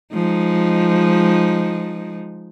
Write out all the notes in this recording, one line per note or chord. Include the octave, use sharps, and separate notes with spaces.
F3 G#3 D#4